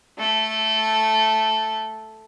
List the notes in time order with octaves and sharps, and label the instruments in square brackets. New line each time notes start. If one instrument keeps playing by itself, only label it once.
[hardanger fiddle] A3 A4